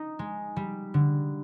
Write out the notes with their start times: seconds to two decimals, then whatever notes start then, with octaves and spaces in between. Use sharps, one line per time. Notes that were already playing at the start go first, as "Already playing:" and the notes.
Already playing: D#4
0.19 G#3
0.56 G3
0.94 D3